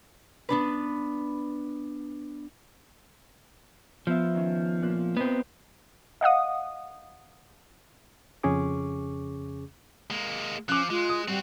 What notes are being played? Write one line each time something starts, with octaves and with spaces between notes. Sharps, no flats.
B3 D4 B4
F3 B3 B4 E5
D#3 C#4
A#2 F4 F#6
B3 C4 B4 D#5 A#5
D#5 F5 F#5 D#6
F2 C#3 C#4 G#4 C#6 D6
G#3 A#3
F3 C#4 D6 F#6
G#3 F4
D#6
G3 C4 F#4